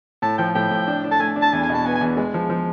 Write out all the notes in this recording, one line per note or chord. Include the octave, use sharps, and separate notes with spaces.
A2 A5
F3 G5
A2 G5
A2
D4
D4
A5
A3 G#5
D4
A5
E2 G#5
G#5
B2
A5
B3 G#5
G#5
E2
G#3
F3
F3